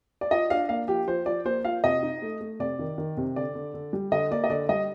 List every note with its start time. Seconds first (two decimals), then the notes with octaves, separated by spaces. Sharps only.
0.21 D5
0.31 F4 D#5
0.50 D4 F5
0.69 A#3 F5
0.88 F3 G4
1.07 F3 C5
1.26 F3 D5
1.45 A#3 C5
1.65 F4 F5
1.84 C3 D#5
2.02 D#4
2.22 A3
2.41 A3
2.60 C3 D5
2.79 D#3
2.98 D#3
3.17 C3
3.36 D3 D5
3.55 D3
3.74 D3
3.93 G3
4.12 D3 D#5
4.31 A#3 D5
4.44 D#5
4.50 D3 D5
4.69 G3 D#5